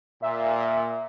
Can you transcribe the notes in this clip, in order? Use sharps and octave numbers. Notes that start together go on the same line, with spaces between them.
A#2 E5